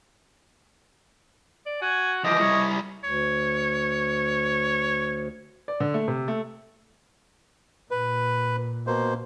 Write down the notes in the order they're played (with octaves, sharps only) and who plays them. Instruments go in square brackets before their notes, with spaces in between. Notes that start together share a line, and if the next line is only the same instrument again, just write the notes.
[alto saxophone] D5
[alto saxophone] F#4 [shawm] G#5
[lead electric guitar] E3 F3 [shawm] G4 [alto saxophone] D#5
[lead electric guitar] G3 E4 [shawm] C#5
[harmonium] D2 [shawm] C#5
[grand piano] D5
D3
A3
C3
A3
[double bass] A#2 [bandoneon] B4
[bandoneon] B2 A#3 C5